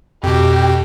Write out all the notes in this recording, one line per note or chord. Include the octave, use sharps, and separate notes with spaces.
F2 B2 G4